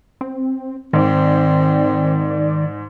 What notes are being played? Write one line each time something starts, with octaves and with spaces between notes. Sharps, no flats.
C4
G#2 D#3 C4 D5